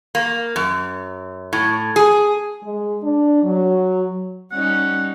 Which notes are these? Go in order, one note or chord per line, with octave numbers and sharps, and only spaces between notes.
A#3
F#2
A2
G#4
G#3
D4
F#3
G3 C#4 D#4 F#5